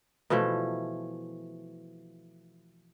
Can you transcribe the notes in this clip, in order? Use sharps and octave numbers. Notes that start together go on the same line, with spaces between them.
B2 E3 F3 A3